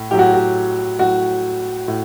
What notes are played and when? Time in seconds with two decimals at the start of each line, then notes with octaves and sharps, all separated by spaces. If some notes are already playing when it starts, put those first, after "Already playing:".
Already playing: A2
0.11 A2 F#3 G4
0.19 F#4
0.34 F#4
0.99 A2 F#3 F#4
1.88 A2